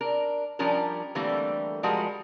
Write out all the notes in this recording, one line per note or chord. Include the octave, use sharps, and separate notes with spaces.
D4 A#4
F3 G3 C#4 D4 A#4
D3 E3 G3 A3 A#3 C4
F3 G3 G#3 F#4 G#4 A#4